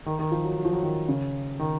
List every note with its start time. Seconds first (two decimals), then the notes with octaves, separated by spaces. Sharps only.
0.06 D#3
0.19 D#3
0.32 F3
0.44 F#3
0.57 F#3
0.65 F3
0.72 F#3
0.83 D#3
1.08 C#3
1.60 D#3